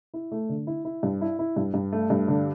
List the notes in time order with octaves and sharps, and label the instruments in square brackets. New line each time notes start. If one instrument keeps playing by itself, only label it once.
[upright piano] E4
A3
D3
E4
E4
G2
E4
E4
G2
G2
A3
G2
D3